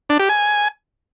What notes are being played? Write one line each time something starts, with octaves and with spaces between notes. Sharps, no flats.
D4
G4
G#5